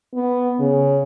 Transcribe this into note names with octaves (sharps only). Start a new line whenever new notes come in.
B3
C#3